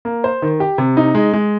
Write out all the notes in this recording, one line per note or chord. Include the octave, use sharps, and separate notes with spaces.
A#3
C5
D#3
G4
C3
D#4
G#3
G#3